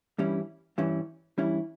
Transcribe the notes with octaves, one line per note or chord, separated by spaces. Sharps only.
G2 E3 G3 C#4 E4
G2 E3 G3 C#4 E4
G2 E3 G3 C#4 E4